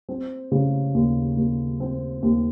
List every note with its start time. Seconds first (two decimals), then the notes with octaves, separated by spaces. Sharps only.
0.09 C4
0.52 C#3
0.94 D#2
1.37 D#2
1.80 C4
2.23 D#2